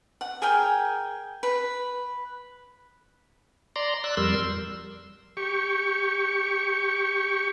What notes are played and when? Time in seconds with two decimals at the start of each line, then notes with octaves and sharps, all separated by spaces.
0.21 F#5
0.42 G#4 A#4 G5 G#5
1.43 B4
3.76 D5 A#5 C6
4.04 D5 E6 F#6
4.17 F2 G3 A#4 C6 E6
5.37 G4 C#6